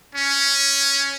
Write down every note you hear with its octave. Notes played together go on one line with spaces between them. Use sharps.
C#4